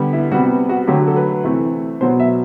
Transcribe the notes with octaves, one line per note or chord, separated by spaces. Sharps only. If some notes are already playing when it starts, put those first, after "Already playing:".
Already playing: D3 G3 B3
E4
C3 G3 B3 F#4
F#4
D3 F#3 A3 G4
A4
B4
C3 E3 A3
B2 F#3 B3 C5
E5